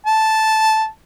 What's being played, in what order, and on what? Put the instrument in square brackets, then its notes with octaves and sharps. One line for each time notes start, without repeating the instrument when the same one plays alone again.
[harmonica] A5